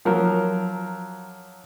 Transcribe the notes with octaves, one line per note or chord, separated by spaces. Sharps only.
F3 F#3 A#4